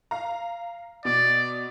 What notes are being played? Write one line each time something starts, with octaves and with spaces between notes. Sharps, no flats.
F5 A#5
B2 D5